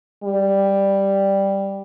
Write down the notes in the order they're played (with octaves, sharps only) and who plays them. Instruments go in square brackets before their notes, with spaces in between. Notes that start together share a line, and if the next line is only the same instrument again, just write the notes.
[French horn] G3